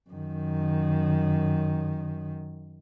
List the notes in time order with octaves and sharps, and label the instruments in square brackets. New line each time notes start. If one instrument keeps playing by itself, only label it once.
[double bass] F#2 D#3